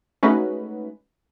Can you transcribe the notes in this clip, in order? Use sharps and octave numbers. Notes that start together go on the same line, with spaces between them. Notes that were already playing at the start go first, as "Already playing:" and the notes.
G#3 A3 C#4 D#4 F#4 B4